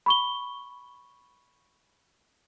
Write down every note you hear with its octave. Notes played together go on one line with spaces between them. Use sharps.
B5 C#6 G7